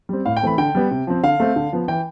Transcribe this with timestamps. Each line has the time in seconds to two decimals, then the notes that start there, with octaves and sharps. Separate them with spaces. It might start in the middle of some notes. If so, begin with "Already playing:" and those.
0.09 G3 C4
0.25 A2 F5
0.37 G5
0.42 E3 A3 C4 B5
0.58 D3 G5
0.75 G3 B3
0.91 C3
1.07 F3 C4
1.23 D3 F5
1.40 A3 C4
1.56 D3
1.73 F3 B3
1.88 E3 G5